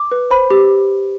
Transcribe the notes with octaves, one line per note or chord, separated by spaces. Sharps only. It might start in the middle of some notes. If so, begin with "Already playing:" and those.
Already playing: D6
B4
C5 B5
G4